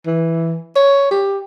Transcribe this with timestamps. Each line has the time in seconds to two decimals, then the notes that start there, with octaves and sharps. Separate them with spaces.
0.06 E3
0.75 C#5
1.11 G4